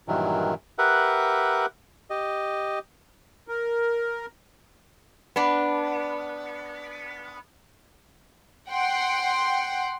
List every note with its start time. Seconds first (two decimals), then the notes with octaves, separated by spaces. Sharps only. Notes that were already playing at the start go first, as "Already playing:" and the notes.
0.08 G2 A#2 D#3 E3 F#3
0.78 G4 A#4 B4 E5 F#5
2.10 G4 D#5
3.48 A#4
5.36 B3 D4
8.71 F#5 G5 C6